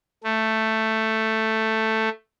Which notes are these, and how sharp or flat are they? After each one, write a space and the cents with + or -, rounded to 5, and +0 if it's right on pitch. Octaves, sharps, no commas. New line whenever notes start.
A3 +5